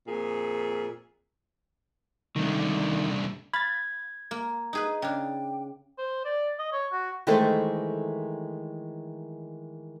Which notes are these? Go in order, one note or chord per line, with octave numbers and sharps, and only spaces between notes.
F2 A#2 G#4
C2 D3 D#3
F5 B5 G#6 A6
A#3
D#4 G#4 B4
C#3 D4 G5
C5
D5
D#5
C#5
F#4
D#3 E3 G#3 A3 A4 C5